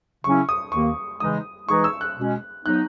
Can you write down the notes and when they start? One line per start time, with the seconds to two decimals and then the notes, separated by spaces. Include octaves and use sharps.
0.24 C#3 F#3 C#4 E4 C#6
0.49 D#6
0.72 D#2 D#3 A#3 C#6
1.20 C#3 E3 G#3 D#4 D#6
1.69 E3 G#3 D#4 G#4 B4 C#6
1.84 E6
2.01 F#6
2.17 B2 G#3 C#4
2.65 F#3 B3 D#4 F#6